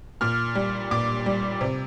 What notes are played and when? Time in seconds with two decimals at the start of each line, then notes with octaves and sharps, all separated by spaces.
0.21 A#2 F6
0.55 G3
0.91 A#2 D6
1.26 G3
1.61 C3